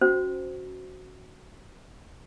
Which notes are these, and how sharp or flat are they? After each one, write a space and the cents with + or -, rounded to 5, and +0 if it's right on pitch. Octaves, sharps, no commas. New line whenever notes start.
C#4 +0 F#4 +0 C5 -10